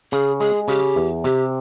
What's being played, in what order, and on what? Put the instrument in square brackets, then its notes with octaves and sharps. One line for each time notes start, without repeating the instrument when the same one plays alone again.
[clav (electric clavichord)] C#3 [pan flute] G#4
[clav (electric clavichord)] G#3 [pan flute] G#4
[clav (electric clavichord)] C#3 [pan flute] G4
[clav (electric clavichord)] E2
[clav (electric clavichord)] C3 [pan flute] G4